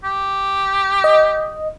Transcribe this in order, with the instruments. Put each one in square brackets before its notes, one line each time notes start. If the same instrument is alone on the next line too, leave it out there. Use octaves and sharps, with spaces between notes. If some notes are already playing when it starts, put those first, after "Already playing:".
[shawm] G4
[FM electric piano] D#5